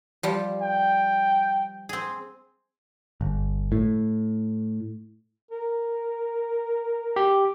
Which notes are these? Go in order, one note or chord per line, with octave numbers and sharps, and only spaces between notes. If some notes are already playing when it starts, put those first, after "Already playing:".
F3 G3 G4
G5
C4 G#4
G1
A2
A#4
G4